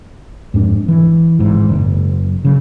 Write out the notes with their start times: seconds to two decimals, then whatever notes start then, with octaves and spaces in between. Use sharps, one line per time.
0.54 F2 G#2 A#3 D4
0.88 E3
1.39 G#1 G#2 E3
1.69 F#1
2.45 C#3 F#3